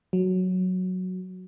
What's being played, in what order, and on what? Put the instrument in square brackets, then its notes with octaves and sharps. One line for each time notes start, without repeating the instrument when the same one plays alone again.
[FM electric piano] F#3